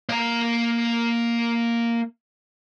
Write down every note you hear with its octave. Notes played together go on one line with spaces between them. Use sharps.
A#3 A#5